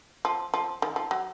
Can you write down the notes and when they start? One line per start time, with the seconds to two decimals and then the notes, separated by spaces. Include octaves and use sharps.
0.25 F3
0.54 F3
0.82 D#3
0.96 F3
1.11 F#3